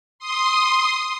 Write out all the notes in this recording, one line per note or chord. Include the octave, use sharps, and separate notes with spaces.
C6 D#6